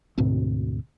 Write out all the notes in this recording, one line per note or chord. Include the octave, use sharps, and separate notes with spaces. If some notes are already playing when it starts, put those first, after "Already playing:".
D2 G#2 B2 C4